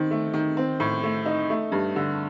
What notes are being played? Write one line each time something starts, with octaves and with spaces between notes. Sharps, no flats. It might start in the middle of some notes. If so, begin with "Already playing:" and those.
Already playing: D#3 C4
A3
D#3
C4
A2
A3
D#4
A3
G2
D3